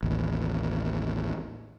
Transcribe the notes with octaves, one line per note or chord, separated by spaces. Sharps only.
A1 D#2